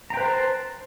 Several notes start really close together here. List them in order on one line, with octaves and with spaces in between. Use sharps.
A#5 G5 B4 C5 A5